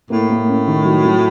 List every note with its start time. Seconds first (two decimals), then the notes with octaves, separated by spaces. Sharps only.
0.10 A2 A#3
0.30 A#3
0.49 C#4
0.68 D#3
0.85 F#3
1.05 F#3